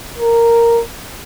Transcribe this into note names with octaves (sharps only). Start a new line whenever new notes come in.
A#4